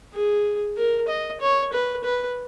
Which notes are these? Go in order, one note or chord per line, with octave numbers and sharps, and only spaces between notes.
G#4
A#4
D#5
C#5
B4
B4